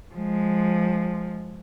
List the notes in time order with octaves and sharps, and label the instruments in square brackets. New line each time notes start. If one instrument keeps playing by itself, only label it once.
[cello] F3 G#3